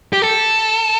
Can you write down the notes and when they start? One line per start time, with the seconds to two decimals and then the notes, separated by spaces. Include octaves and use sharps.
0.13 G4
0.22 A4